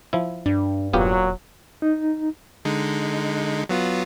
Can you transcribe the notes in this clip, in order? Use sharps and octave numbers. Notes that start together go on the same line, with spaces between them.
F3 E4
G2 D4
E1 A#2 F#3 B3 F4 G4
D#4
D3 G#3 D#4
F#3 B3 F4